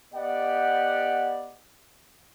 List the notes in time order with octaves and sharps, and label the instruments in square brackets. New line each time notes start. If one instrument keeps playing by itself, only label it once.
[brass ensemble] B3 G4 D5 D#5 F#5